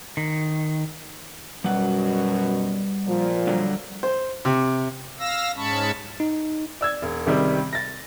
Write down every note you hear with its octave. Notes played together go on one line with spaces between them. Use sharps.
D#3
F#2 B2 G3 F#5
A#2 F3
D3 F#3 G3
C5
C3
F5 E6 A#6
G#2 G#3 C#4 A5 B5 C#6
D#4
D5 E6 G#6
E1
C#2 C3 D#3 G3
A6 A#6